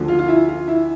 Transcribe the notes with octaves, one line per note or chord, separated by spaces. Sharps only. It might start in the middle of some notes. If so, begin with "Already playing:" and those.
Already playing: D2 D3 F3
F4
F4
E4
F4
E4